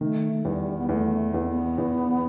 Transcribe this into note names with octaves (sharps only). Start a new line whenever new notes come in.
D#3 A3
E2 G3
B3
E2 A3
E2 B3
C4
B3
E2